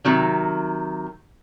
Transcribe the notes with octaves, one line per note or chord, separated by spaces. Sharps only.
C3 D#3 F#3